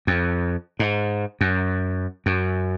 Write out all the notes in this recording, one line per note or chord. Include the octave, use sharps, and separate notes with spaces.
F2
G#2
F#2
F#2